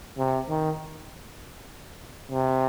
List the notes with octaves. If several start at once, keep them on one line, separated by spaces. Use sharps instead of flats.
C3
D#3
C3